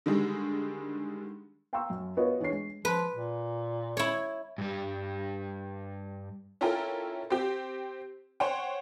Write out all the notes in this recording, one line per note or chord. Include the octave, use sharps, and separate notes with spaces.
D3 D#3 G3 G#3
F5 G5 A#5 C6 C#6 E6
F#2
B3 F4 F#4 B4 C#5 D#5
E3 D4 G#4 C#5 C7
G#3
F3 B4
A#2
E4 C#5
G2 G3
C#4 E4 F4 A4 A#4 G5
C4 G4
C5 C#5 F#5 G5